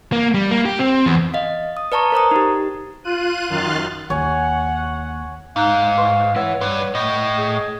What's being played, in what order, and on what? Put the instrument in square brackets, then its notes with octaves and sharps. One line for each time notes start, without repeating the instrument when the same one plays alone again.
[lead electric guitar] A#3
G3
A#3
G4
C4
E2
[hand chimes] D#5 F5
D#6
B4 D5 A5 A#5 C#6
A#4 C5 A#5 D#6
D#4 G4
[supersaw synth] F4 F#6 D#7
F#2 D#3 C6 F6 F#6 A6
[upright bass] D#2 [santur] C#5 G#5 [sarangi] F#5
[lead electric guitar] G#2 [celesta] D#4 A#5 F#6 [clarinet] F5
[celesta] B4 C6 C#6
[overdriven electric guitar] E4 B4 [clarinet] C#5 [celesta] F#5 E6
[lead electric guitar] G2 [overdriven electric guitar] B4
[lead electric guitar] A2 [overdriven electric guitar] D#5
[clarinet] G#4